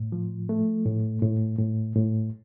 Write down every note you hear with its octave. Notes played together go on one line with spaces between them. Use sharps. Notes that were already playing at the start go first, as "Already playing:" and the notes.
Already playing: A2
F3
A3
A2
A2
A2
A2